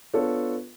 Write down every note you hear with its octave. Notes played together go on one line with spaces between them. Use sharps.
B3 D4 F4 A4 C#5